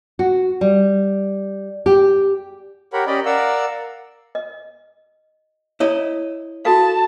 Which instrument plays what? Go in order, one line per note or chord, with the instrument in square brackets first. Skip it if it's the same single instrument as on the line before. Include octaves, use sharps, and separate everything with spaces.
[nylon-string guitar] F#4
G3
G4
[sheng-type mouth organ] G4 A#4 C#5 F#5 B5
C#4 G4 D5 D#5 B5
A#4 D5 F5 F#5 E6
[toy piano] D#5
[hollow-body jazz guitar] E4 D#5 [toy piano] C#5
[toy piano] F#4 A4 F5 [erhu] A5